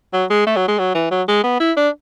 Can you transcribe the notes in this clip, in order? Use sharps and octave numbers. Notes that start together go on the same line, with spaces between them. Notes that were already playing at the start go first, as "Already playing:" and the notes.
F#3
G#3
A3
F#3
G#3
F#3
E3
F#3
G#3
B3
E4
D4